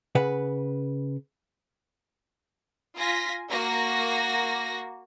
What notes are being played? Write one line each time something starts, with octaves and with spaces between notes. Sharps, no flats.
C#3 B4 F#5
F4 G#5 A#6 B6
A#3 F#4 A#6